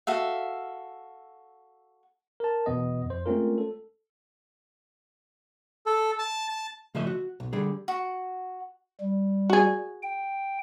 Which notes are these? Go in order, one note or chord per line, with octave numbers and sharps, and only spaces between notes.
F#4 A4 E5 F5
A#4 A5
E2 B2 B3 D#5
F2 C5
G#3 A3 C4 C#4 F4 A#4
A4
A4
A5
A5
C#3 F3 A3 D#5 E5
F#4
B1
D3 G3 G#4
F#4
G3
F#4 G#4
G5